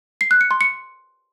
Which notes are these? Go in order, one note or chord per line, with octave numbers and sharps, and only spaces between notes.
C7
F#6
C#7
C6
C#7